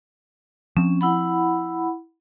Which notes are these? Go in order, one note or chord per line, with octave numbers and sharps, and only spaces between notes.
F3 C4 C#4
E4 F#5 B5